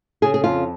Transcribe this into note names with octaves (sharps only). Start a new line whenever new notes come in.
C#3 G#4
G#4
F2 F4